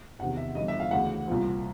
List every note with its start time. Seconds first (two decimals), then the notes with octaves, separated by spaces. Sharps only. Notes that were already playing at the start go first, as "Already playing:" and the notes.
0.19 E2 F#5
0.22 C3 D#3
0.37 E5
0.55 G1 G2 E3 D#5
0.68 E5
0.80 F5
0.91 D2 C#3 E3 F#5
1.28 C2 A#2 F3